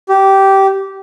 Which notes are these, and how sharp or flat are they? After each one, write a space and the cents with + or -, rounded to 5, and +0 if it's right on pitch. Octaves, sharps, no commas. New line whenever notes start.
G4 -15